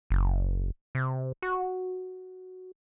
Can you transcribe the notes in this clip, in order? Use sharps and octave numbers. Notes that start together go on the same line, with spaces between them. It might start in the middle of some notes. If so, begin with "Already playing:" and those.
F#1
C3
F#4